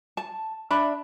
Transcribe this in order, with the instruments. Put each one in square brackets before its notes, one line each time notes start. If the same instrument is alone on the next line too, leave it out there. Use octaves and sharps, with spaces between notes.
[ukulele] A5
D4 E5 B5